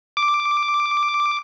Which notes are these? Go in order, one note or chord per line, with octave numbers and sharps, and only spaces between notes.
D6